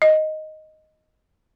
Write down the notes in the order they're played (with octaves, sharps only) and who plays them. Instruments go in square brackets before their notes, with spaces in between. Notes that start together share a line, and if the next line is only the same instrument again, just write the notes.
[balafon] D#5